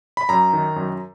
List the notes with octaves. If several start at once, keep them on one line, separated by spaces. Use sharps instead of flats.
B5
F#2 A#5
D#3
F#2